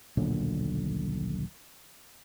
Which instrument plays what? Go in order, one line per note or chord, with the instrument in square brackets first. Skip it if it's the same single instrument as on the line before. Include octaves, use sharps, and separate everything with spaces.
[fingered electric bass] D#1 B1 A#2 D3